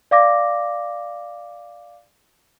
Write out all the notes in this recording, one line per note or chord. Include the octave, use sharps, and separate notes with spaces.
D5 F5 D6 A#6